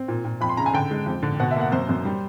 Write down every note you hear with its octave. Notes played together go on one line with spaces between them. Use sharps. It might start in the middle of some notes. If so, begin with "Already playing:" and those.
Already playing: C4
A#2
A#2
F2 B5
C6
C#3 A#5
G#5
D3 G5
G#3
F2
D3
B2 F#5
E5
A#3 F#5
F#2 C5
F#2
G3